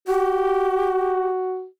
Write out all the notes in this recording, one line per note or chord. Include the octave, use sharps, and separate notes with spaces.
F#4 G4